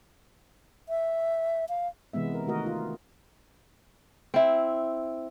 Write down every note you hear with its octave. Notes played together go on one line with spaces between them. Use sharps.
E5
F5
C3 E3 G#3 B3 E5
A#4
D#3 A3 F#4 A#4 D#5
F4
C4 E4